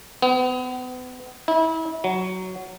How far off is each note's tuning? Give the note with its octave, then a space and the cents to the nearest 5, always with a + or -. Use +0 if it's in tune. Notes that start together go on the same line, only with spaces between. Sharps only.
B3 +35
E4 -30
F#3 +5